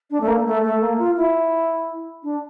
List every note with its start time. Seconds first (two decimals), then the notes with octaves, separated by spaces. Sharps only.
0.11 D4
0.21 A3
0.28 A#3
0.46 A3
0.63 A3
0.81 A#3
0.99 F4
1.17 E4
2.24 D4